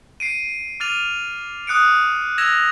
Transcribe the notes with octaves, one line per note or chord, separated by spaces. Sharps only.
C7 D7 D#7
D6 F6 A6 D#7 F7
D#6 F#6 C#7 D7
E6 G#6 A#6 E7 F7